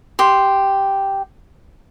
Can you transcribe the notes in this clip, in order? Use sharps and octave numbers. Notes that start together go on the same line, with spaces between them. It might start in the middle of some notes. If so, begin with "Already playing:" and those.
G4 C6